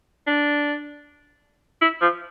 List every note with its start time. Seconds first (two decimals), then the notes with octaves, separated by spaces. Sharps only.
0.27 D4
1.81 E4
2.01 F3